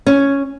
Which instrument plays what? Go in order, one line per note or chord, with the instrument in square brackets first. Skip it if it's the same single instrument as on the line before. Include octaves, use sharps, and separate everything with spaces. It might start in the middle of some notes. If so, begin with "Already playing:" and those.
[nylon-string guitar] C#4